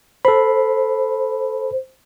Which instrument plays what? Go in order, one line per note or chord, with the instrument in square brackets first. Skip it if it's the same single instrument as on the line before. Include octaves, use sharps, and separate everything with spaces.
[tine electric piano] A4 B5 [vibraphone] C5